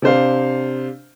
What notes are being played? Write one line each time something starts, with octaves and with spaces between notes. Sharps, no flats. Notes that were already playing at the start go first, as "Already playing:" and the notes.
C3 D4 C5 F5